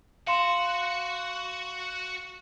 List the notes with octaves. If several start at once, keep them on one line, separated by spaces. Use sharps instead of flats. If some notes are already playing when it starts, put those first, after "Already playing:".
F#4 F5 C6 E7